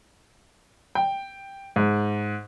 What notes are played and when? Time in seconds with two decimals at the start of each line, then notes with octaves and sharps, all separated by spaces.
0.95 G5
1.76 G#2